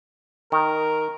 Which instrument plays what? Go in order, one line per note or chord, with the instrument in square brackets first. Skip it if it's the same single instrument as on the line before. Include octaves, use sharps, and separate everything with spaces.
[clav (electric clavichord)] D#3 [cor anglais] A#4